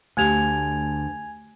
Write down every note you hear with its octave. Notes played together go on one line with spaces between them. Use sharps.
D2 D3 A3 G4 G#5 G#6 F7